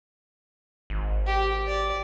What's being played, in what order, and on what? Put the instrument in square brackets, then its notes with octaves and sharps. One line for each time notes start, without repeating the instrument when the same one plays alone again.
[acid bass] G#1
[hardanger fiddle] G4
D5